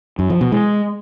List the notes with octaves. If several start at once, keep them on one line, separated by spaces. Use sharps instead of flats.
F#2
F3
B2
G#3